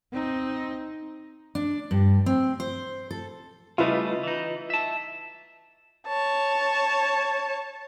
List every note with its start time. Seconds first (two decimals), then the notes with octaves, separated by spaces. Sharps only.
0.12 C4 D#4
1.55 D4
1.91 G2
2.26 C4
2.60 C5
3.11 A4
3.78 C#3 G3 A3 E4 F4 B4 D#5
4.23 E3 D#4
4.70 E5 A5
6.08 C#5 A5